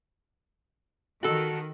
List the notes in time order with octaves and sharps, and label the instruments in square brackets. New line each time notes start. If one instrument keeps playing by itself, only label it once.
[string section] D#3 [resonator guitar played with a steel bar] F#4 A4